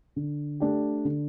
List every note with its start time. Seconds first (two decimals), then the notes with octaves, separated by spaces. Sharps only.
0.16 D3
0.60 A3 D4 G4
1.05 D3